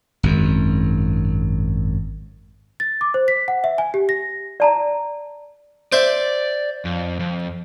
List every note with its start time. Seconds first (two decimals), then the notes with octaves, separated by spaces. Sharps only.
0.23 G#1 F#2
2.80 A6
3.01 D6
3.14 C5
3.28 B6
3.48 F#5
3.64 E5
3.78 G#5
3.94 G4
4.09 A#6
4.60 D5 A5 A#5
5.92 C5 D5 E5
6.85 F2
7.20 F2